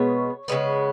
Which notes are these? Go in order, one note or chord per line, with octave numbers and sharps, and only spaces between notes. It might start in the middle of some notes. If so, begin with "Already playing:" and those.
Already playing: B2 G#3 B3 C#5
C#3 G#3 B3